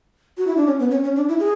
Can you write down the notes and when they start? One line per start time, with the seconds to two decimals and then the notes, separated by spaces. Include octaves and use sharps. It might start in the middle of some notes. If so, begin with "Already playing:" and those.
0.37 F#4
0.47 E4
0.57 D4
0.67 C#4
0.79 B3
0.91 C#4
1.04 C#4
1.16 D4
1.29 E4
1.40 G#4